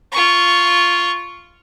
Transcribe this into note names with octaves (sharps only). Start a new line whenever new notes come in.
F4 C#6